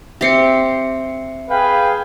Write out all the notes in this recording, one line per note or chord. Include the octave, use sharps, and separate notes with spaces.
C4 G4 E5 C7 C#7
G#4 B4 F5 G5